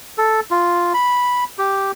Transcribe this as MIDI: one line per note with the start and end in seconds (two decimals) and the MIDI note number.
0.18 0.40 69
0.51 0.93 65
0.94 1.44 83
1.59 1.92 67